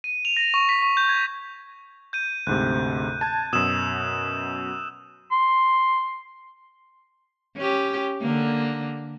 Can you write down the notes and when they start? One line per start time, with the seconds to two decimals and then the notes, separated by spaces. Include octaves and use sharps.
0.04 D#7
0.25 F7
0.37 A#6
0.54 C#6
0.69 B6
0.82 C#6
0.97 G6
1.09 G#6
2.13 G6 D#7
2.47 D2 G#2 C3 F#6
3.21 A5 G#6
3.53 F#2 B2 D#6 E6 E7
5.32 C6
7.57 C#4 G4
8.21 D3 A#3